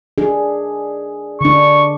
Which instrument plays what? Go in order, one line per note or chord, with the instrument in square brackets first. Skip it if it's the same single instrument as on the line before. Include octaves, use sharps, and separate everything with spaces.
[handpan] D4 G#4
[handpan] D3 D4 [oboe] C#6